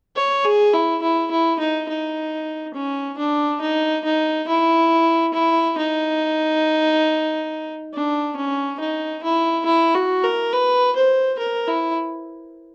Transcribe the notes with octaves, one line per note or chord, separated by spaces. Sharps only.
C#5
G#4
E4
E4
E4
D#4
D#4
C#4
D4
D#4
D#4
E4
E4
D#4
D4
C#4
D#4
E4
E4
F#4
A#4
B4
C5
A#4
E4